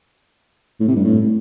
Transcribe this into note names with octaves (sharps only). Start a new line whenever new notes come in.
A2
C3
G2
A2